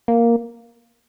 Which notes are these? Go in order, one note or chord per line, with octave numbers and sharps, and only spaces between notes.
A#3